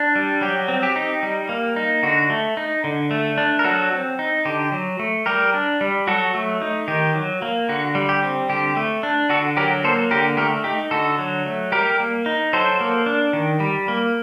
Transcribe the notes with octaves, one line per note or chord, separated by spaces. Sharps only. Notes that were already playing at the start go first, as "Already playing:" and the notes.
Already playing: D4
G3
F#3 G4
C4
G4
D#4
G3
A#3
D#4
D3 F#4
A3
D#4
D3
A3
D4
A#4
F#3 F#4 A4
C4
D#4
D3 G4
F#3
A3
G3 G4 A#4
D4
G3
F#3 F#4 A4
A3
D#4
D#3 G4
F#3
A#3
D3 F#4
G3
G4
C4
D3 G4
A3
D4
D3 F#4 A4
F#3 G4 A#4
A#3 A4 C5
D3 G4 A#4
A3 G4 A#4
D#4 G4
D3 F#4 A4
F#3
A3
G3 G4 A#4
A#3
D#4
F#3 A4 C5
A#3
D4
D#3
G3
A#3